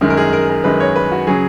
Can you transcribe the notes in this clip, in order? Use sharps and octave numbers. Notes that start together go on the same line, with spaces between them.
F#2 D#3 G#3
A#4
G#4
A#4
A#4
F#2 D#3 G#3 B4
C#5
B4
F#4
C#3 F#3 G#4